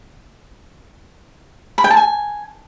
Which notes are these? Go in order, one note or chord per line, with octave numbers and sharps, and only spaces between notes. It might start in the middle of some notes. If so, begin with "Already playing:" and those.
B5
G5
A5
G#5